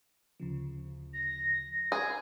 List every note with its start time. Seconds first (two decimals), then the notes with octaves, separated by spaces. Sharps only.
0.40 D2 C#3 F3
1.14 A#6
1.92 G#4